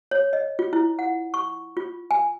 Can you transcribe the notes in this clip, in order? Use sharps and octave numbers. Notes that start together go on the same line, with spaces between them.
C#5
D#5
F4
E4
F#5
C#6
F4
G#5